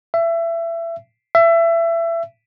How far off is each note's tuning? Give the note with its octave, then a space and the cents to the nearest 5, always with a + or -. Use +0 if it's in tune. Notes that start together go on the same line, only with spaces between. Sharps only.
E5 +25
E5 +25